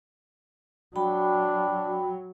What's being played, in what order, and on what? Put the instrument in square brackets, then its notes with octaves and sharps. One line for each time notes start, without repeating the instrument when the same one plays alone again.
[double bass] F#3 [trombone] D4 [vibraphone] F#4 G5 B5